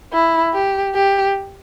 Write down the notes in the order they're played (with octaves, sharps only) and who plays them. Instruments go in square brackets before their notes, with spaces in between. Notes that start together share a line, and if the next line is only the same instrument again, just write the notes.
[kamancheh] E4
G4
G4